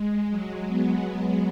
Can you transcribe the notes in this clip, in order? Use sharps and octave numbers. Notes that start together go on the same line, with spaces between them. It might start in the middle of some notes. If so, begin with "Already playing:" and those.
Already playing: G#3
F#3
B3